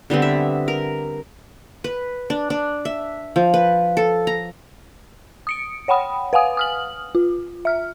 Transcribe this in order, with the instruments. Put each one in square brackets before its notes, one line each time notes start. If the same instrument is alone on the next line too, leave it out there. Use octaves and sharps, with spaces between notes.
[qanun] D3 G3 B3 C4
E5
A#4
B4
D4
D4
E5
F3
B4
A4
A#5
[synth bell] D#6 C#7 D7
C#5 F#5 G5 B5 D#6
B4 F5 F#5 G#5 D#6
D#6 F6 F#7
F4
E5 F6